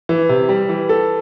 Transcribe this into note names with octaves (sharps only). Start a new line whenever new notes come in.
E3
C3
G3
E3
A4